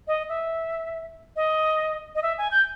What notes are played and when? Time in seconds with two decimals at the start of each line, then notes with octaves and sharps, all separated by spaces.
0.08 D#5
0.29 E5
1.36 D#5
2.15 D#5
2.23 E5
2.38 G#5
2.51 G6